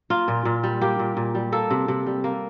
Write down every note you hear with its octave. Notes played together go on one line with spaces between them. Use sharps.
A#3 F4
A#2
A#2
G3
A#3 G4
A#2
A#2
G3
A#3 A4
C3
C3
G3
A#3